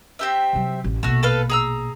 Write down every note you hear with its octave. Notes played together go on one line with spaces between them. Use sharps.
C4 G4 E5
C3 F#3
A1
A#1 B2 A3 F#4
A4 B4 F5
G#4 A#5 E6